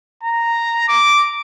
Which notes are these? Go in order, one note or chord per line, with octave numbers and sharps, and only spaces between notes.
A#5
D6